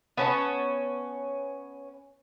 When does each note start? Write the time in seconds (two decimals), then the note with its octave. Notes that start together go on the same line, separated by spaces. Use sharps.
0.17 B3 C#4 A5